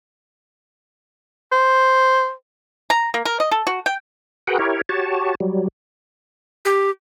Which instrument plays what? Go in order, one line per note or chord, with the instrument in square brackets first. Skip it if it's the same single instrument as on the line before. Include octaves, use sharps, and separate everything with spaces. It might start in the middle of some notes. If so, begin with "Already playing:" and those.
[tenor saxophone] C5
[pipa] A#5
A#3
A#4
D#5
A4
F#4
G5
[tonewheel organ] F#4 G#4 A#4 B4 F#5 G5
E4 G4 A#4 C#5
F#4 G4 C#5 A5
F#3 G3
[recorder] G4